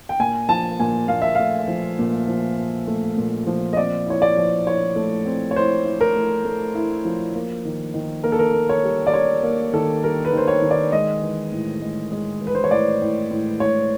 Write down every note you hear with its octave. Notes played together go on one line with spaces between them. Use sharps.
G5
A#2 G#5
F3 A5
A#2 G#5
A#2 F5
E5
A3 F5
F3
A#2
F3
A#2
A3
A#2
F3
D#5
C4 D5
E4 C#5
D5
F3
E4 C#5
A3
C4
C#5
E4 C5
E4
A#4
A3
A3
E4
F3
A#3
D#3
D#3
A#3 A#4
A4
A#4
A#3
C#5
G3
D5
G3 C#5
A#3
D#3 A4
G3 A#4
B4
D#3 C5
C#5
D#3
D5
G#3 D#5
E3
A2
G#3
G#3
E3
B4
C5
C#5
A2 D5
A2
A2
A2 C#5